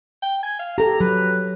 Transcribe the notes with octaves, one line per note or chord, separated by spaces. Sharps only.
G5
G#5
F5
G4 A4 A#5
F#3 B4